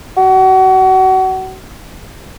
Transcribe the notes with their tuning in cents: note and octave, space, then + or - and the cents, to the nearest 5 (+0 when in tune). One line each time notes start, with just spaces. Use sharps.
F#4 +30